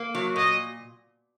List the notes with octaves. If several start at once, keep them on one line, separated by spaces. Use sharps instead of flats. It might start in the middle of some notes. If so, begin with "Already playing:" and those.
Already playing: A#3
F#3
A#2 D#5